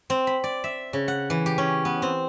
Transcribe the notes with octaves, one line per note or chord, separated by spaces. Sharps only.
C4
B5
D5
E5
C#3
F#5
E3
G4
C#4
B3
C4